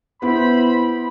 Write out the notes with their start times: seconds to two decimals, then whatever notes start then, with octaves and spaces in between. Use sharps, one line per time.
0.22 B3 E4 C5 B5